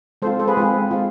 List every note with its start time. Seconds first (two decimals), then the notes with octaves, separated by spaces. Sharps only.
0.22 G#3 C4 F4 A4 C5
0.39 A4 C5
0.48 G#4 B4
0.57 G#3 C4 F4
0.91 G#3 C4 F4